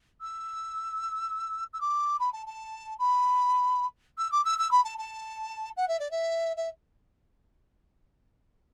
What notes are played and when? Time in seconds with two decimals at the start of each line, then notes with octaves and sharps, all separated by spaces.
0.21 E6
1.73 E6
1.81 D6
2.20 B5
2.33 A5
2.47 A5
2.99 B5
4.18 E6
4.32 D6
4.45 E6
4.59 E6
4.71 B5
4.84 A5
4.98 A5
5.77 F#5
5.88 E5
6.00 D5
6.11 E5
6.57 E5